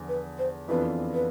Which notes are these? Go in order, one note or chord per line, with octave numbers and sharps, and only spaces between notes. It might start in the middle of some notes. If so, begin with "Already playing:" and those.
Already playing: E2 D3 F3 B3
B4
C5
F2 E3 B3 D4 F4 B4
B4